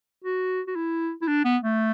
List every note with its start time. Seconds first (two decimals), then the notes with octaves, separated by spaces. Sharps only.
0.24 F#4
0.67 F#4
0.76 E4
1.22 E4
1.28 D4
1.45 B3
1.63 A3